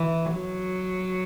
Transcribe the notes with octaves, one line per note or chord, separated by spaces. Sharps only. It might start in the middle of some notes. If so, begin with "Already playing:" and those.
Already playing: E3
F#3